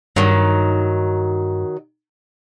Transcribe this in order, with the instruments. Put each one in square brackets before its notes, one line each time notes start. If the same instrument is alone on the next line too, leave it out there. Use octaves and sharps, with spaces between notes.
[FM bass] G2 [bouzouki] D#3 F#3